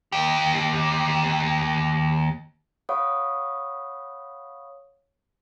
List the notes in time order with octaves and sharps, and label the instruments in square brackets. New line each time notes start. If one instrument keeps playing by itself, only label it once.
[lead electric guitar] D#2 G4
[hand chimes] C#5 F5 F#5 B5 C#6 D#6